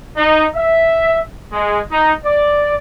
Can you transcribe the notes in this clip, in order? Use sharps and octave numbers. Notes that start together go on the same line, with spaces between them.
D#4
E5
G#3
D#4
D5